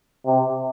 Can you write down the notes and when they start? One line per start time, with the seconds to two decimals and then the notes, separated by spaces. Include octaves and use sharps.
0.26 C3